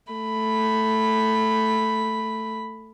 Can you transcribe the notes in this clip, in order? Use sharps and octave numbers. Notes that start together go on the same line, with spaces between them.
A3 B5